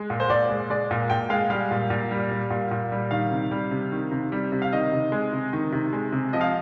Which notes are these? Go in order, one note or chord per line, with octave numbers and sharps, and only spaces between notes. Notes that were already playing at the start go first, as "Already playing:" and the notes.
Already playing: G#3
A#2
C5
A#2 D5
G#3
G#3 D5
A#2
A#2 G5
G#3 F5
G3 F5
A#2
A#2
G3
G3
A#2
A#2
G3
D#3 F5
C3
G3
C3
D#3
C3
G3
C3
F5
D#3 D#5
C3
G#3
C3
D#3
C3
G#3
C3
F3 D#5
F5